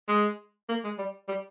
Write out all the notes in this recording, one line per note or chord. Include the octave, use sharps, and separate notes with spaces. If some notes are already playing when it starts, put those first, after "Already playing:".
G#3
A#3
G#3
G3
G3